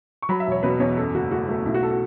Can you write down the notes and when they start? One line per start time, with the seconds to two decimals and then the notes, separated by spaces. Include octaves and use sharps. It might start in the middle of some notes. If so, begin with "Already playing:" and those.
0.22 C#6
0.29 F#3 B5
0.40 E5
0.47 E1 C#5
0.63 B2 B4
0.80 E2 C#5
0.97 F#2 A4
1.14 F#1 F#4
1.31 A3 F#4
1.49 A3 F#4
1.66 B1 E4
1.74 F#4
1.83 A4
1.91 F#4